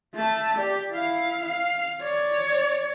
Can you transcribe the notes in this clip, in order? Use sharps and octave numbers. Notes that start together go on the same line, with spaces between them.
A3 A5
G4 D5
E4 F5
F5
C#5 D5